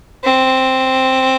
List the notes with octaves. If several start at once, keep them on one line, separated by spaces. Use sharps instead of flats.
C4